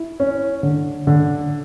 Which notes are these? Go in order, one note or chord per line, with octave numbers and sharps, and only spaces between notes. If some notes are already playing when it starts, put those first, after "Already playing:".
Already playing: E4
C#4
D3
D3